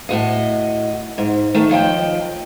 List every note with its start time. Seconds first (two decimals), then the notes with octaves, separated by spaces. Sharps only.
0.09 A2 F#4 D#5
1.18 G#2
1.54 D#3 A3
1.70 D#2 F3 D#5 G5